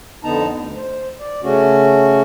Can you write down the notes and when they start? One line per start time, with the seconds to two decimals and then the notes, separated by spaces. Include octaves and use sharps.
0.24 F2 D3 B3 D#4 A5 A#5
0.55 D2
0.76 C5
1.20 D5
1.43 C#3 A3 C#4 F#4